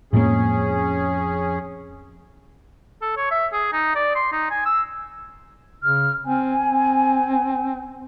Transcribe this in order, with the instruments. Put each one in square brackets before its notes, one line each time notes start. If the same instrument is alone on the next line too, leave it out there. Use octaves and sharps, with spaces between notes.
[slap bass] F2 F3 [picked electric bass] A2 G#3 A#3 [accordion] C#4 G#4
[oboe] A4
C#5
E5
G#4
D#4
D5
C6
D#4
G#5
E6
[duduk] C#3 [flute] F6
[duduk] C4 [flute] G#5
[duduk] C4